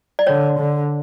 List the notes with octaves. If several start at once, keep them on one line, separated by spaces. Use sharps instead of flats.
D5
D3 C#5
D3